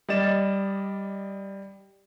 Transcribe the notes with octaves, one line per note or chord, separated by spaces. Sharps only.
G3 D5 D#5 A6 E7